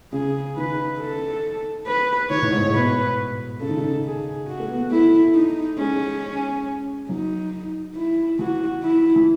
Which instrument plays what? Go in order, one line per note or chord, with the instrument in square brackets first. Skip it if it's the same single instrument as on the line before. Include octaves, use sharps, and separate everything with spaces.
[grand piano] C#3 [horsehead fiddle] G#4
[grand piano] D#3 [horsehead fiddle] B4
[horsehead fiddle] A4
B4
[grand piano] D#3 [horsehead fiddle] C#5
[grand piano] A2
G#2
A2
[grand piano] B2 [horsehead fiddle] B4
[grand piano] C#3 [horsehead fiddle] A4
[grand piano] D#3
C#3
[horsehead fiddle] G#4
F#4
[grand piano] A3
B3
B3
[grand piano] A3 [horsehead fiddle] E4
[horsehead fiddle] D#4
[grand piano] G#3 [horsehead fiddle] C#4
[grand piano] F#3 [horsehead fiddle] D#4
[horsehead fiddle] E4
[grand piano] E3 [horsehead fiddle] F#4
[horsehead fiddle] E4
[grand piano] E3